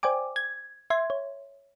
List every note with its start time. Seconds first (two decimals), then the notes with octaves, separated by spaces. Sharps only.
0.03 C5 D5 G5 G#5 D6
0.36 G#6
0.90 E5 C6 G#6
1.10 C#5